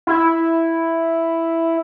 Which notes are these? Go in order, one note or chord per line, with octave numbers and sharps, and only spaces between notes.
E4